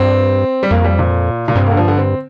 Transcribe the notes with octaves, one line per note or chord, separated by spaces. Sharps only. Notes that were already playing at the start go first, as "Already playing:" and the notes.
Already playing: G2 C4
G3
F2 A#3
G3
A#2
A#2
G2 C3
A#3
D3
F3
D3
C4